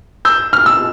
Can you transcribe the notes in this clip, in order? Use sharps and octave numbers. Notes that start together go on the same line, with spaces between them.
E6 G6
F6
E6